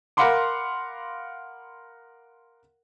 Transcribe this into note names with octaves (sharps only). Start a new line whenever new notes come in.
A#4 F5 F#5 B5 C6 D6